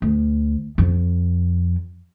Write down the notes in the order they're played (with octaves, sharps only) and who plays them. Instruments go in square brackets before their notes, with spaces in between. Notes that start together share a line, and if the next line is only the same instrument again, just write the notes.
[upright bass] D2
F2